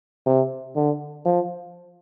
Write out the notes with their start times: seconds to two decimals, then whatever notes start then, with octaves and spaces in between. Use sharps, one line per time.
0.26 C3
0.76 D3
1.25 F3